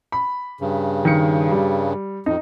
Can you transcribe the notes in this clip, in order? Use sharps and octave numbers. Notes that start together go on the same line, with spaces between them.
B5
G2 C#3
D#3 C#7
G3
F2 D#4